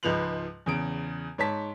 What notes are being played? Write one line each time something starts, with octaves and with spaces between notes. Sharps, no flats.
C#2 G#2 F3 B4 F7 F#7
E2 C#3 D7
G#2 C#5 A5 B6